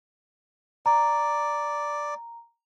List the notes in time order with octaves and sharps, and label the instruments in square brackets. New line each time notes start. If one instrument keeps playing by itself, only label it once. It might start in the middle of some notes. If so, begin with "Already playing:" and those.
[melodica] D5 [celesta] A#5